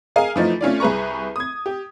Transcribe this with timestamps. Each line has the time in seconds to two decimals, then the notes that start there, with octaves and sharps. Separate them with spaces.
0.16 G#4 A#4 D#5 F5 G#5
0.36 E3 F3 A3 D#4
0.61 A3 C#4 F4 D5
0.80 C2 G#4 B4 A#5 C#6
1.36 D#6 G#6
1.66 G4